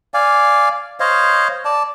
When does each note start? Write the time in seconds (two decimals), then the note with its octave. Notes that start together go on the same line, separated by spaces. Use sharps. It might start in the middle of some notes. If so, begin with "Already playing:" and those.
0.14 D5 F5 G#5
1.00 C5 C#5 D#5 F5
1.65 D5 A5